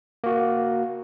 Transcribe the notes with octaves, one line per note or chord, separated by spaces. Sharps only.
A#3 F#4